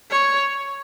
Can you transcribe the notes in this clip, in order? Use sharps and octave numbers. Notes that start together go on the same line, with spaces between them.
C#5